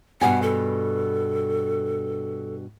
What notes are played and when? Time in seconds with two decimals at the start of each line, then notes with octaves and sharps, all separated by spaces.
0.21 G2 B2 F#5 G#5
0.42 A4